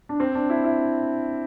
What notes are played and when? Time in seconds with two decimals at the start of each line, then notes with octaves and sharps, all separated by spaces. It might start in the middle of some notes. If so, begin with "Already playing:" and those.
0.09 D4
0.20 C4
0.35 D4
0.50 E4
0.64 E4